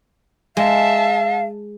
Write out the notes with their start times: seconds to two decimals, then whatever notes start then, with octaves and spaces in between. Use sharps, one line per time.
0.57 G#3 E5 F5 A5